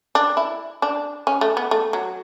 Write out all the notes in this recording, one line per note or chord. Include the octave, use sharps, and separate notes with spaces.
D4
E4
D4
C#4
A3
B3
A3
F#3